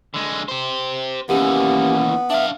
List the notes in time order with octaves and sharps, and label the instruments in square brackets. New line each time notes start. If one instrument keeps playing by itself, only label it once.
[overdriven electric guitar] D3 G#3
G4 C5
[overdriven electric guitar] D#2 E3 [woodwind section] A#3 C#4 [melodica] B3 [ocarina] G4
[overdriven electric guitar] D4 F5 [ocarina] E5